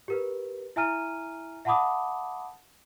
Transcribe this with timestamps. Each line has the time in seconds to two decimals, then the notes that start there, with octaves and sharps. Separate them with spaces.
0.08 G4 A#4 B4
0.76 E4 E5 G#5 A#5 F6 D#7
1.65 E5 F#5 A5 B5 D6 D#6